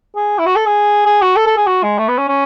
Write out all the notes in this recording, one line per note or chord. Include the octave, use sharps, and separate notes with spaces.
G#4
E4
F#4
A4
G#4
G#4
F#4
A4
A4
G#4
F#4
G#3
A3
B3
C#4
C#4